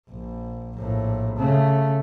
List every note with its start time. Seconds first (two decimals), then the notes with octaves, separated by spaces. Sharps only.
0.10 A#1
0.77 A#1 A2
1.37 C#3 A3